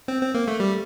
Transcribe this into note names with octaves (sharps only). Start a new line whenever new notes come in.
C4
C4
A#3
A3
G3